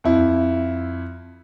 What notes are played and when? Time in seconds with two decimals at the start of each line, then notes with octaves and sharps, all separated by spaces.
0.04 F2 E4